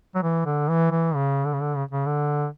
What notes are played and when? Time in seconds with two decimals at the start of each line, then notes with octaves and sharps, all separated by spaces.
0.15 F#3
0.23 E3
0.46 D3
0.69 E3
0.91 E3
1.15 C#3
1.45 D3
1.54 C#3
1.61 D3
1.76 C#3
1.91 C#3
2.06 D3